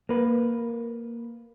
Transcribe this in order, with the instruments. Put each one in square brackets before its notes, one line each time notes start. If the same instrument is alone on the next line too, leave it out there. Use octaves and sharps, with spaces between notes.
[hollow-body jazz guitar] A#3 B4